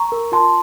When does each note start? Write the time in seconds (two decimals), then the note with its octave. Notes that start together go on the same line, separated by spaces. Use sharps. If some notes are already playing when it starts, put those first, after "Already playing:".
Already playing: A#5 C#6
0.12 A#4
0.32 F4 A5 C6